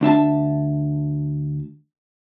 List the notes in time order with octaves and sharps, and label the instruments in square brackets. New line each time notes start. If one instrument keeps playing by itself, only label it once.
[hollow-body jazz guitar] D2 D4 E5 A5